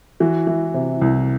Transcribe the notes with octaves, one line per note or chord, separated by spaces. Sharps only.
E3 F#4
E3
C3
C2